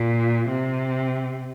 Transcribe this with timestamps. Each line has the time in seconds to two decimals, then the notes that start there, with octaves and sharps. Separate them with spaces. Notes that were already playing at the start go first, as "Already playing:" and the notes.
Already playing: A#2
0.49 C3